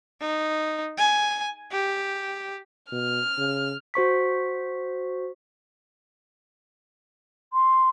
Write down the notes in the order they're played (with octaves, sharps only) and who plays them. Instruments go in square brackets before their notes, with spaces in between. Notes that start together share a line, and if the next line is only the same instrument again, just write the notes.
[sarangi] D#4
G#5
G4
[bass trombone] B2 [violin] F6
[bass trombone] C#3
[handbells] F#4 C5 C#6 B6
[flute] C6